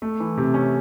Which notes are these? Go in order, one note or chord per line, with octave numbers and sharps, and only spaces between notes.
A3
E3
C3
C#4